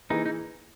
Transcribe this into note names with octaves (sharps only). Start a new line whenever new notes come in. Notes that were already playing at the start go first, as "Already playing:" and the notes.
E3 A#3 D#4 E4 G#4 B4
D#4